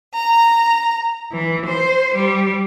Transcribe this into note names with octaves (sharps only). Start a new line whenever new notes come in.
A#5
E3
C5
G3